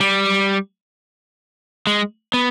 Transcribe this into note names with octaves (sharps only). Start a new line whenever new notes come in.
G3
G#3
B3